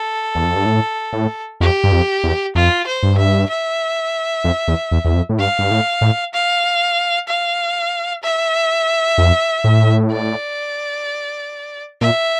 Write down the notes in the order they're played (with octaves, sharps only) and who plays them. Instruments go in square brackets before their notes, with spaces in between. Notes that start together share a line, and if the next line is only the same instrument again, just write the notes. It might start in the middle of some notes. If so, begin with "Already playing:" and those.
Already playing: [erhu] A4
[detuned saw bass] E2
F2
G2
A2
A2
[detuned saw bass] F2 [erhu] G4
[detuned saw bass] G2
F2
E2
[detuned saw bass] F2 [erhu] F4
[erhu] C5
[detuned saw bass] G2
[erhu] E5
E5
[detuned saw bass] F2
E2
E2
E2
F2
A2
[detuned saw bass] G2 [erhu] F5
[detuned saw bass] G2
A2
A2
[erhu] F5
F5
E5
[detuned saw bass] F2
A2
[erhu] D5
[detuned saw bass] A#2 [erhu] E5